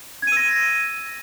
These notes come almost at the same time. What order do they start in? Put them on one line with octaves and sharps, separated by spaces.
G#6 D#7 E6 A#6